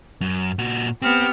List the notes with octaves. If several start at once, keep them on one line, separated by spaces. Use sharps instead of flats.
F#2
A#2 F#4
B3 C4 G4 F6